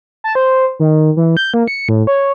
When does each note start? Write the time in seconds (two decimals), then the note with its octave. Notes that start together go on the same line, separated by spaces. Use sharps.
0.24 A5
0.35 C5
0.80 D#3
1.17 E3
1.37 G6
1.54 A#3
1.68 C#7
1.89 A2
2.07 C#5